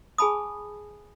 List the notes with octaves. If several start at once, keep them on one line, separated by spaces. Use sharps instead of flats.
G#4 G#5 A5 B5 D#6